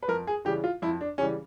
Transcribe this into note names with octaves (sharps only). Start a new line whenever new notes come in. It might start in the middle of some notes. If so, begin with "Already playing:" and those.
B4
F2 A#4
G#4
C#3 E3 G3 G4
F4
F2 E4
D4
C#3 E3 G3 C#4